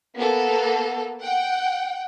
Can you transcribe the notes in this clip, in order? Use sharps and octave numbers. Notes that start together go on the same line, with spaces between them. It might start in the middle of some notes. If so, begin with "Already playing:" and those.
A#3 B3 A4
F#5 G5